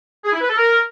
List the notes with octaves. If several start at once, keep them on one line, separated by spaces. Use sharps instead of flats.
G#4
E4
B4
A4
A#4